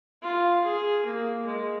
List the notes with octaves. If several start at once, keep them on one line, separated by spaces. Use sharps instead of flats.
F4
G#4
A#3
G#3